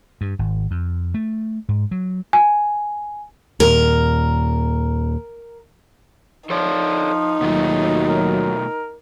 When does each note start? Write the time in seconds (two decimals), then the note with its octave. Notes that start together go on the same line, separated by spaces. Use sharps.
0.21 G2
0.39 G#1
0.71 F2
1.14 A3
1.69 G#2
1.91 F#3
2.33 G#5
3.60 D#2 A#2 A#4
6.50 F3 D#4 A4 C#5 D5
7.41 D#2 B2 F#3 A3 F4
8.09 A#4